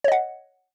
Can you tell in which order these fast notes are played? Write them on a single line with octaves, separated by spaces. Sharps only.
C#5 D#5 F#5